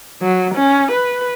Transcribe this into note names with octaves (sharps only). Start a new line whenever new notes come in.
F#3
C#4
B4